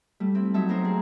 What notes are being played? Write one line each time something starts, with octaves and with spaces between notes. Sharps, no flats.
G3 A3
C4 E4
F#3 D#4 E5 A5
A3 B3 C#4 D#4 A#4 C5
G#4